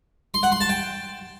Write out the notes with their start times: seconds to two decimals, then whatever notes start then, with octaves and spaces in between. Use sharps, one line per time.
0.34 C6
0.43 F#5
0.52 C6
0.61 A5
0.69 G5